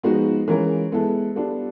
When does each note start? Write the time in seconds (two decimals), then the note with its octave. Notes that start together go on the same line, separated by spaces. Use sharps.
0.03 F3 G#3 B3 D#4 F#4
0.48 E3 G#3 C#4 F4 A#4
0.92 G#3 B3 E4 A4
1.35 G3 B3 D4 F4 A4